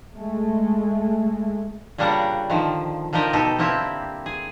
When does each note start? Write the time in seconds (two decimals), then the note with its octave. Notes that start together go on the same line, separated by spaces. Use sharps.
0.15 G#3 A3
1.98 A#2 C#3 G3 D4 A#4 F#5
2.50 D3 D#3 F3
3.13 D3 F3 D#4 G4 A#4 D5
3.33 B2 D#4 G4 A4
3.59 D3 A#3 C4 E4 G4
4.26 G#4